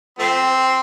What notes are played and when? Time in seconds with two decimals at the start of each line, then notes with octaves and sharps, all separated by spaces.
0.19 F3 A3 C4